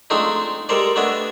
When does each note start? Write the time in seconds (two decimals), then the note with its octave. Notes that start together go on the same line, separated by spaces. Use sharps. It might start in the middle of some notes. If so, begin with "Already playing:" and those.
0.10 F3 G#3 A3 C4 D4 D#4
0.69 G3 G#3 A4 A#4 C5 D5
0.96 A3 B3 D4 D#5 E5 G#5